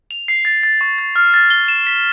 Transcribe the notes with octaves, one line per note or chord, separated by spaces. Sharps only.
F7
C7
A6
A6
C#6
A6
F6
A6
G7
E7
B6